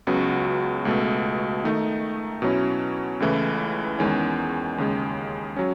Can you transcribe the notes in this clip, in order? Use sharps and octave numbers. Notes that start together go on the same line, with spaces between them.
C#2 C#3 F#3 B3 F#4
C#2 B2 A3
D#3 A3 D#4
B2 F#3 C#4 E4
C#2 C#3 E3 A3 E4
E2 D#3 G#3 C#4
D#2 C#3 G#3
F#3 C#4